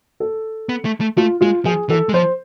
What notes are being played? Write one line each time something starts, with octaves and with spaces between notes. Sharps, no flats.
A4
B3
A3
A3
A3 F4
G#3 F4
F3 G#4
E3 A4
G#3
F3 C5